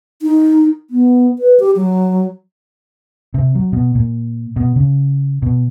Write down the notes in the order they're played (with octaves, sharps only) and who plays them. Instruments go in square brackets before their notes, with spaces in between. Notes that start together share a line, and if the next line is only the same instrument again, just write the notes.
[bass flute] D#4
B3
B4
G4
F#3
[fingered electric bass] C3
F#3
B2
A#2
B2
C#3
B2